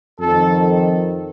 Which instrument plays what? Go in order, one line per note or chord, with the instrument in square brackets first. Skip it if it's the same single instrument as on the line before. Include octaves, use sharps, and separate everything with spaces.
[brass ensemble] F2 D#3 A4